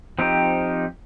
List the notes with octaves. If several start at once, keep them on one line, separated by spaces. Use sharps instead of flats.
F3 C4 D#4 G4